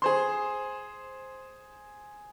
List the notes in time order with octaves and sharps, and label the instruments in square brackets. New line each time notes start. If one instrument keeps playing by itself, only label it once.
[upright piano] G#4 C5 C6